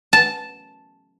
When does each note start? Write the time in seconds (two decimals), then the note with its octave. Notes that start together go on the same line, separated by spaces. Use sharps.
0.13 A5